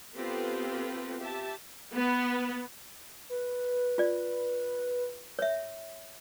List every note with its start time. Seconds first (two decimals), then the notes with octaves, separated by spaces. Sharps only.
0.16 B3 C4 F4 G4 A4 B4
1.19 G4 E5 A5
1.94 B3
3.29 B4
3.98 F4 D5
5.39 C#5 E5